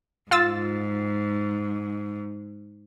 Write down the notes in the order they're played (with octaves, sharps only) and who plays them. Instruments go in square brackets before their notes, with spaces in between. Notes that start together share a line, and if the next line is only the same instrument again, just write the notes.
[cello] G#2 [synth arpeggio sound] F4 E6 A6